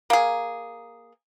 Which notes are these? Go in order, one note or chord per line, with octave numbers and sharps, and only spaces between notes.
A#3 G#4